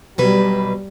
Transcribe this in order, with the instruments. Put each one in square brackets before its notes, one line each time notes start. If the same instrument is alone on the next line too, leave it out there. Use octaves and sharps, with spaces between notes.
[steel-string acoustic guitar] B2 F#3 B4 [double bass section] G3